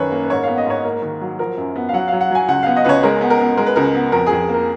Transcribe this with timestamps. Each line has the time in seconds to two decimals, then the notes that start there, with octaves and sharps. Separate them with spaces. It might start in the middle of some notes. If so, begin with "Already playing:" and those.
Already playing: F#2 D#3 B4 C#5
0.12 A#3
0.24 B4
0.30 G#2 C#5
0.43 B3 F5
0.58 D#5
0.66 G#2 C#5
0.84 A#3 A#4
1.02 D#3
1.21 F#3
1.39 F3 A#4
1.58 F#2
1.76 B3
1.89 F5
1.93 F#3 F#5
2.08 F#3 F5
2.21 F#5
2.31 F#3 G#5
2.48 C#2 F#5
2.63 B3 F5
2.76 D#5
2.84 C#2 B4 C#5
3.03 G#3 A#4
3.21 B3
3.30 A#4
3.40 B3
3.57 G#3 A#4
3.66 B4
3.76 C#2 A#4
3.94 B3
4.12 F2 A#4
4.26 F2 G#4
4.49 A#3
4.54 A#4